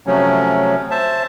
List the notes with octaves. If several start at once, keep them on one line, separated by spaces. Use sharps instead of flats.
C3 F3 F#3 A3 C#4
C5 E5 A5